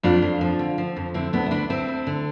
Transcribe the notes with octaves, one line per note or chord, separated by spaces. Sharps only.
F2 D4 F4
F2
F3
D3
F3
F2
D3 C4 E4
D2 B3 D4
E4
D2 B3 D4
D2 C4 E4
D2
D3